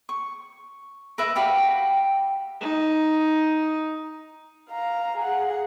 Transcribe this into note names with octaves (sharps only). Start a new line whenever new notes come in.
C#6
A#4 B4 E5
F#4 G4 F5 B5
D#4
F5 A#5
G#4 F#5